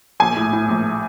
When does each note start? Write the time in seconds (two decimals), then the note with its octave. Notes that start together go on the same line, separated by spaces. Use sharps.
0.20 A#1 G#5
0.36 A2
0.53 A2
0.69 A#1